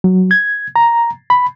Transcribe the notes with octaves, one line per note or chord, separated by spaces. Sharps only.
F#3
G#6
A#5
B5